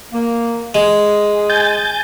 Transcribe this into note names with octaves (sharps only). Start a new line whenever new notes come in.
A#3
G#3 G#4
G#5 G6 A6